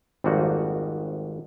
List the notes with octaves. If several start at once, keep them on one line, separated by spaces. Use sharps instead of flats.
G#1 F2 G3 A#3 D#4 F#4